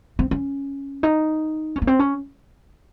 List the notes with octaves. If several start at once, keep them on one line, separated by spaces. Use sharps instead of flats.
C4
C#4
D#4
C#4
A#3
C4
C#4